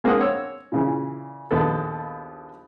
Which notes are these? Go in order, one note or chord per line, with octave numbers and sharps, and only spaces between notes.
G#3 A#3 C4 D4 F#5 D#6
C#5 E6
A#2 C#3 E3
A#1 D#2 B3 A4